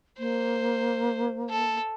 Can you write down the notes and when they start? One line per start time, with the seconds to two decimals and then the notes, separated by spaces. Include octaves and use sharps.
0.19 A#3 C5
1.50 A4